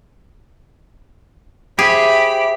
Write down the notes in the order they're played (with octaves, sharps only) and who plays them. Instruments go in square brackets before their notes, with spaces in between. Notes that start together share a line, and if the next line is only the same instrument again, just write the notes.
[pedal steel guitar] G4 [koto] G#4 [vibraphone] C5 E5 [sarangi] B5